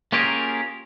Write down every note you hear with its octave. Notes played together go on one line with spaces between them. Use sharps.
A#3 C#4 F4 G4 G#4 A#4